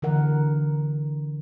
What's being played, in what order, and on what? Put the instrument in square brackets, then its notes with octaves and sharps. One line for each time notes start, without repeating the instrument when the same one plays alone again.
[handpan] D3 E3 A#4 F#5